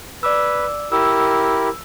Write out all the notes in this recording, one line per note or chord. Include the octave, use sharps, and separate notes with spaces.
B4 D5 D6 E6
E4 G4 A#4 E6